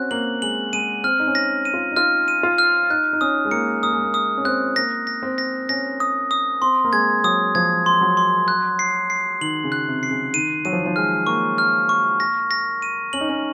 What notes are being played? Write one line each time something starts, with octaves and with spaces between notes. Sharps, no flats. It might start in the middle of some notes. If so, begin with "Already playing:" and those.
Already playing: C4 C#4 F#4 F#6
A#3 F#7
G#3 F#7
G#3 D#7
C4 F6
D#4
C#4
A#6
D#7
F4
D#4
F4 F6
D#7
F4
F6
D#4 F#6
D#4
C#4 D#6
G#3
A#3 C#7
A#3 D#6
G#3
A#3
D#6
C#4
C4 F#6
A#3 A#6
A#6
C4
A#6
C#4 A#6
D#6
D#6
C4 C6
A#3
G#3 G#6
F#3 D#6
F3 G#6
C6
F#3
C6
F#6
C7
C7
D#3 F#7
C#3
F#6
C3
C7
C#3
D#3 D#7
F#3 D#7
F3
D#3
F3
G#3 F6
A#3 C#6
F6
C#6
A#6
A#6
D#7
C#4 F#7
D#4
C#4